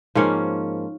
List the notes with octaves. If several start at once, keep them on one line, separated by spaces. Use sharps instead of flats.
G#2 F3 A#3 C#4 C#5